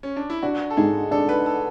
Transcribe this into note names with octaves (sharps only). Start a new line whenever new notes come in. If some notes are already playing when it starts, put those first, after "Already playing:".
C#4
D4
E4
D4 F#4
A4
G#2 G#4
D4 A4
B4
A4